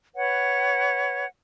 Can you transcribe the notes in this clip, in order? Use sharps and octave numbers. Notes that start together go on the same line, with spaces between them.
B4 C#5 F#5